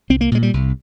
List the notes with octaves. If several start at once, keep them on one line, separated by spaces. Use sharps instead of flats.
C2 C4
A#3
A#2 G#3
G3
C2